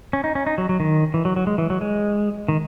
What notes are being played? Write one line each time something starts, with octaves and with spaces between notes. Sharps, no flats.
C#4
D#4
C#4
D#4
F#3
F#3
D#3
E3
F#3
F#3
G#3
E3
F#3
G#3
D#3